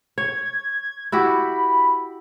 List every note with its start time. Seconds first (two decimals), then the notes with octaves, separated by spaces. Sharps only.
0.18 C#5 G#6
1.12 E4 F#4 G4 B5